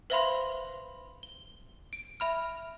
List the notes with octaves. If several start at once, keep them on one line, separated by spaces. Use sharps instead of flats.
B4 C5 E5 F5 B5 C6
G7
D7
E5 B5 F6